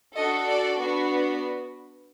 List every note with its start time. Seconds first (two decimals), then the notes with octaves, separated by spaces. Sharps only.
0.15 D4 F#4 A4 D#5
0.47 D5
0.78 B3 D4 F#4